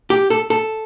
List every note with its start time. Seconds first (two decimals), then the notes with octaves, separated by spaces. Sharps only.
0.10 G4
0.30 A4
0.50 A4